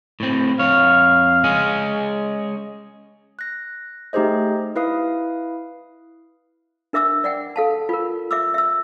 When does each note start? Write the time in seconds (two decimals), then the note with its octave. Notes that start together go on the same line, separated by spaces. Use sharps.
0.20 A2 C4
0.59 F2 C#5 F5
1.44 G#3 C#4 G#4
3.39 F#6 A#6
4.13 A3 D#4 G4 G#4 C5 D#5
4.76 E4 B4 F5 D#6
6.93 D4 A#4 E5 D6 E6
7.24 D5 F#5 G5
7.56 A4 F5 A5
7.89 F4 A#4
8.31 E5 D6 E6
8.54 E5 E6